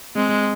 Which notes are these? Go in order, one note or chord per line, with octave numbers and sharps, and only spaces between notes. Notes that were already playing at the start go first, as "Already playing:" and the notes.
G#3 C4